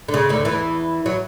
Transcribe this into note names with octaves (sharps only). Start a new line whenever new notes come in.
D3
C#3
D2 D3
E2 E3
F#3